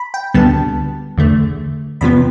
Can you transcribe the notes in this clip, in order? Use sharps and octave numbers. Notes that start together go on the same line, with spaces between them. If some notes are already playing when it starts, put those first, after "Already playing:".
Already playing: B5
G5
D2 D3 G3 B3 A5
E2 D3 A3
E2 C3 F3 B3 B5